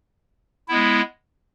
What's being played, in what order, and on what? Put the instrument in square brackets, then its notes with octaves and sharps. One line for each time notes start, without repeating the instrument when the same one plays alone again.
[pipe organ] G#3 B3 E4